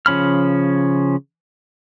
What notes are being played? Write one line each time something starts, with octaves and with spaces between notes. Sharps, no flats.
C#3 F3 C#4 B5 F6